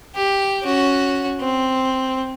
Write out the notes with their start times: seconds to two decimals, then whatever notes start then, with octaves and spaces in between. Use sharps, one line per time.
0.15 G4
0.63 C#4 F#4
1.40 C4